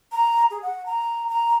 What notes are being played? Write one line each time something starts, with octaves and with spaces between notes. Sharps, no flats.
A#5
G#4
F#5
A#5
A#5